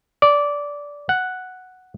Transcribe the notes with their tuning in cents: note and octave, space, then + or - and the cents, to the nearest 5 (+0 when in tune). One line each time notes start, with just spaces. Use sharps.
D5 -15
F#5 +0